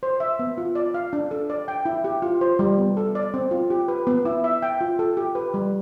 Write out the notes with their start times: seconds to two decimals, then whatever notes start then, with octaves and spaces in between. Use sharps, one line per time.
0.03 C5
0.20 E5
0.39 B3
0.58 F4
0.75 D5
0.94 F5
1.13 D4
1.31 A4
1.50 D5
1.68 G5
1.85 E4
2.04 G4
2.22 F4
2.41 C5
2.59 G3
2.78 B3
2.97 A4
3.15 D5
3.34 C4
3.51 F4
3.70 G4
3.88 B4
4.07 B3
4.25 E4
4.44 E5
4.63 G5
4.81 F4
4.99 A4
5.17 G4
5.35 B4
5.54 G3